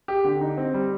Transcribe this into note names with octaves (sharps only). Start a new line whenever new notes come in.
G4
D3
D#4
C4
G3